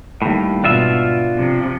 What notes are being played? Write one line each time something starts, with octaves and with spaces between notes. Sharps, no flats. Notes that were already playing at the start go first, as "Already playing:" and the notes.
D#2 A2 G3
G#2 B2 D4 F4 E5
C3 F3